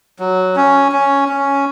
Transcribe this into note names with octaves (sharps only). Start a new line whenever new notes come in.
F#3
C#4
C#4
C#4